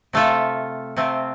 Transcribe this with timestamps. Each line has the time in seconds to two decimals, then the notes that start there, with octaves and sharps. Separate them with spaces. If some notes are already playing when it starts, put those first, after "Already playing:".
0.13 C3 A3 F4 A4
0.96 C3 A3 C4 F4